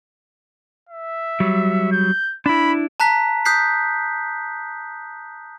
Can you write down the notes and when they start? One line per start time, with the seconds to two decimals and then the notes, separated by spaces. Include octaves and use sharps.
0.90 E5
1.40 F#3 G3
1.92 G6
2.46 D4 E4 B5
3.00 A5 A#5 F#6 B6
3.45 D#6 F#6 G6 B6 C7